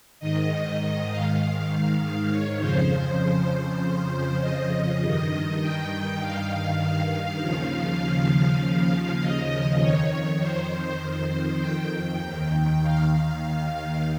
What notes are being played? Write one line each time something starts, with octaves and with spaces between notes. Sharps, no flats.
G#2 D#3 D#5
D#5
F5
F5
C#5
F2 C#3 F3 C5
D#5
G2 D#3
G5
F5
D#2 C#3 F3
F5
D#5
F2 D#3 C#5
C5
G5
D#2 D#3
F5